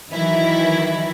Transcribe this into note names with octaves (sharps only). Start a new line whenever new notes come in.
D#3 E3 F#3 E4